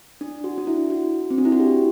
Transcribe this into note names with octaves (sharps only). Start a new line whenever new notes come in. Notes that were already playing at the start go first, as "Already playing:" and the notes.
D4
F#4
D4
E4
F#4
C4
D4
E4
F#4
G4